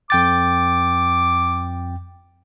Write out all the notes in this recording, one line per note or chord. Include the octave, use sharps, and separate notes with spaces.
F2 G5 D6 A6